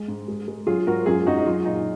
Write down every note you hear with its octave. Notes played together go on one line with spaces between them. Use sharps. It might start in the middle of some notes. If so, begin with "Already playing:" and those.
Already playing: G#3
G#2
G#3
G#3
F#3 F4 G#4
G#2 F#4 A#4
F#2 F4 G#4
F#2 D#4 F#4
D#4
F#3 F4
A#2 D#4